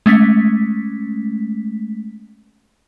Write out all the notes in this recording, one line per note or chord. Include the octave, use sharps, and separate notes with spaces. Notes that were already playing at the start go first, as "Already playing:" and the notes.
G#3 A3 C#4 B6